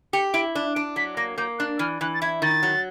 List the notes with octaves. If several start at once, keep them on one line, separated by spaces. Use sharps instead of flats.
G4 C#7
E4 D7
D4
D4 D7
F#3 B6
A#3 A#6
A#3 G6
D4 F#6
E3 F6
E3 F#6
A6
E4 G#6
D#3 A6
F#3